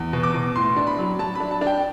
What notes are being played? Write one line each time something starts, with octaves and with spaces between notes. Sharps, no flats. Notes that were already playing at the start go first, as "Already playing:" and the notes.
Already playing: E2
B2
D6
B2
A2 C6
D4
B5
F#3
F#3 A5
D4 B5
A5
D4
G5